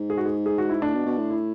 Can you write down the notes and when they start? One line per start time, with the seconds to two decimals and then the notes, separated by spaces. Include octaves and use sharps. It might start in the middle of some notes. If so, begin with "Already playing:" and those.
Already playing: G#2
0.10 G#4
0.18 F#4
0.25 G#4
0.46 G#4
0.58 F#4
0.69 E4
0.82 A2 D4
0.94 B2
1.06 B2
1.18 A2
1.30 E4